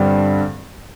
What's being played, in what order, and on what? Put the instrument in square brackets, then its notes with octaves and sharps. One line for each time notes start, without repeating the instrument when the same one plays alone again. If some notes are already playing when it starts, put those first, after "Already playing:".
Already playing: [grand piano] G2 D3 G3 C4